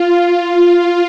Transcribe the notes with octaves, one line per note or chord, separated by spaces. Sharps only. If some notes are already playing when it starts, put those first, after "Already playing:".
Already playing: F4